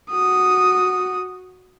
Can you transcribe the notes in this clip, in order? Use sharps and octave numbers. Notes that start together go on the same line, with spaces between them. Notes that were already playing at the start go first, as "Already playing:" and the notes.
F#4 D#6